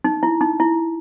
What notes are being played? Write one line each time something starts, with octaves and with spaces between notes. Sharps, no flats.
D#4
E4
D#4
E4